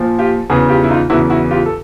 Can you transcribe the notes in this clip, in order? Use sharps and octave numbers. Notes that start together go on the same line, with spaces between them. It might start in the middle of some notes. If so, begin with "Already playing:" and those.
Already playing: A#2 F3
F4 G4
E2 C#3 E3 F#4 G#4
F4 G4
E4
D#4 F4
E2 C#3 E3 E4 F#4
E4 F#4
F4 G4
A4